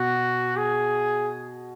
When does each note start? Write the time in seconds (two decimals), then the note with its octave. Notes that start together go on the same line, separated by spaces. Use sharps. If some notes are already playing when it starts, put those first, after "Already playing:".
Already playing: B2 F#4
0.57 G#4